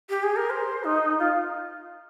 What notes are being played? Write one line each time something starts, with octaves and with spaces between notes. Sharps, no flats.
G4
G#4
A#4
C5
D#4
F4